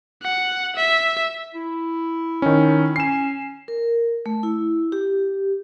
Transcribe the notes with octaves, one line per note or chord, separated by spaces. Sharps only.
F#5
E5
E4
D#3 C#4
C#4 C7 E7
A#4
A3
E4
G4